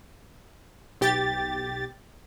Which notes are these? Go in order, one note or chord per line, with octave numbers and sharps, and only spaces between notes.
B1 G4 A6